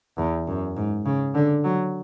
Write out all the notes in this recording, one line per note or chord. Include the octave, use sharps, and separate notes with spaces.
E2
F#2
G#2
C#3
D3
F#3